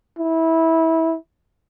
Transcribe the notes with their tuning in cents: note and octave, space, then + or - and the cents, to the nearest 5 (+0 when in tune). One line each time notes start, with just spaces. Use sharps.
E4 -20